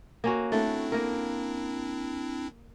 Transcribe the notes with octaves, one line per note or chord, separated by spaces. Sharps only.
A#3 C#4 F#4
A3 C4 D4 E4
A#3 A#4